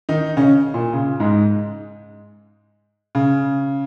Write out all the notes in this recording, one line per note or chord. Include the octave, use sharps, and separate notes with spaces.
D#3 D#4
C#3 C#4
A#2
C#3
G#2 G#3
C#3